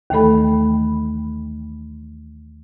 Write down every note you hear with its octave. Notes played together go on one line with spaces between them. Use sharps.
D#2 D#3 E3 A3 A4 B5